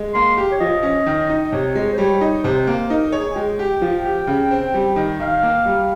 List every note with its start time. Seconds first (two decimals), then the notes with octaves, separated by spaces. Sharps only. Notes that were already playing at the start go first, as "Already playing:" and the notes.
Already playing: G#3
0.14 A#3 C6
0.37 G4
0.52 C#5
0.60 F3 D#5
0.83 C#4
1.06 D#3
1.29 D#4
1.52 C3 C#5
1.75 G#3
1.93 C5
1.98 G3 C#5
2.21 D#4
2.44 C3 C5
2.67 A#3
2.90 D#4 A#4
3.08 A#4
3.12 G#4 C#5
3.31 G#5
3.35 G#3 G5
3.59 G4
3.81 F3
4.05 G4
4.27 C#3
4.51 C4
4.74 G3
4.96 D#3
5.20 D#3 F5
5.43 A#3
5.65 G3